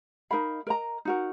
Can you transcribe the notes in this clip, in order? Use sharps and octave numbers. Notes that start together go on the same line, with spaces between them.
D#4 A#4 F5 B5
A#4 D#5 A#5
D#4 F#4 A#4